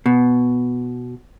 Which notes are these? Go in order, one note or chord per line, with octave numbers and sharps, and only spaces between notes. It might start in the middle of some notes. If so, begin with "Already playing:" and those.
B2